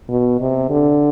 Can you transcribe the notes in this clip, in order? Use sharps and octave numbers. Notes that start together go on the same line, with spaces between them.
B2
C3
D3